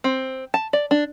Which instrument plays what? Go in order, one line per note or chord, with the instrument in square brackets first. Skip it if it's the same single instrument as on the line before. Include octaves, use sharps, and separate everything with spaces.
[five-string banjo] C4
A5
D5
D4